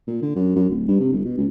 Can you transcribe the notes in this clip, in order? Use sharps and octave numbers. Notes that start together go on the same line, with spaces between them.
A#2
D3
F#2
F#2
D1
G2
C3
G1
B2
C#2